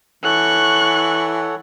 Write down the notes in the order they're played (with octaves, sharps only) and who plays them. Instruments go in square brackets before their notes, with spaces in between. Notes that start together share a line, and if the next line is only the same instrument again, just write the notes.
[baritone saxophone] E3 [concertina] A4 C#5 F#5 [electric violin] C#6 F#6